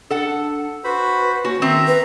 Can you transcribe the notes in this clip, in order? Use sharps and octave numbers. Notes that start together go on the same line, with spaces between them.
D4 A4 F#5
F#4 B4 C5 B5
A#3 C#4 F#4
D#3 C4 E5 A#5
B4